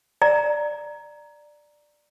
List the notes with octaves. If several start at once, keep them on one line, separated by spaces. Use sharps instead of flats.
D5 A#5